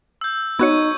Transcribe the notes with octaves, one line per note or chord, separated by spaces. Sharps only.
E6 G6
B3 D#4 F#4 C#5 C#6 G#6